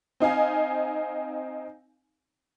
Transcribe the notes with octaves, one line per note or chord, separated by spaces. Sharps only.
C4 D#4 F5 G#5